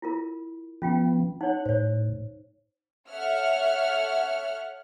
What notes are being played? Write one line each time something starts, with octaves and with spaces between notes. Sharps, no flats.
E4 F4 A#4
F3 B3 C#4 F4 G5
D#4 C#5 F#5
A2 C5 C#5
A4 C#5 E5 F#5 F6